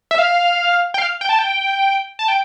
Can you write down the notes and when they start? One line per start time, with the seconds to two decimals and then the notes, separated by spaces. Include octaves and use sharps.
0.11 E5
0.18 F5
0.94 G5
0.98 F5
1.21 G5
1.29 A5
1.39 G5
2.19 A5
2.28 G5